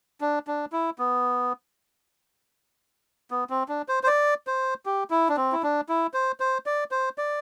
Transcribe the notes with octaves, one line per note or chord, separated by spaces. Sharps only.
D4
D4
E4
B3
B3
C4
D4
C5
C5
D5
C5
G4
E4
D4
C4
E4
D4
E4
C5
C5
D5
C5
D5